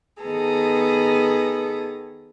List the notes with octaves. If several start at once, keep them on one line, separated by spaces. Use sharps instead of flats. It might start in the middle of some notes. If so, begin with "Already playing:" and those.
D#3 B3 G#4 A4 A#5